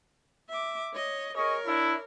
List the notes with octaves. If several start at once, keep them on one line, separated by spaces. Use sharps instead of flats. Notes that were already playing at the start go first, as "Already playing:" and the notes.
E5 D6
C#5 D#5
G#4 A#4 C#5 D#5 C#6
D4 E4